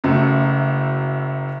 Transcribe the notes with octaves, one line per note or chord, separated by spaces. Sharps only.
F#1 F#2 A3